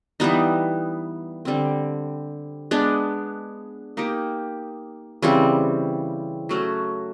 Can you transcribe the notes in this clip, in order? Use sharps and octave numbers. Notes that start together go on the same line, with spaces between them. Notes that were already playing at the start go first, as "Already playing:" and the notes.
E3 G3 B3 D#4
D3 G3 C4
G#3 B3 D4
A#3 D#4 G4
C#3 E3 G3 C4
F#3 A3 C#4 F#4